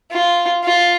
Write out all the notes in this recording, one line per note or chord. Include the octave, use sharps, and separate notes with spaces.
F4
F4